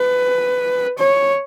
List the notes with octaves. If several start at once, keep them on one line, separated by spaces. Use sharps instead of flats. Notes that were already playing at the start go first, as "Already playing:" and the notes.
Already playing: B4
C#5